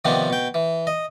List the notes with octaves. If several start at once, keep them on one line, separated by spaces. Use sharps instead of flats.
C3 D#3 F3 B3 C4 D4
B2 G5
E3
D#5